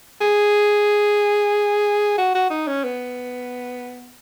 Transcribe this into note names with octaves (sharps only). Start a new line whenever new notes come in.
G#4
F#4
F#4
D#4
C#4
B3